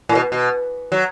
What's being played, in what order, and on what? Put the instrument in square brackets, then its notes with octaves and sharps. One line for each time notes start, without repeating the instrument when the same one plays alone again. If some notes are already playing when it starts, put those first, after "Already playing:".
[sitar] A2
B2
B2
F#3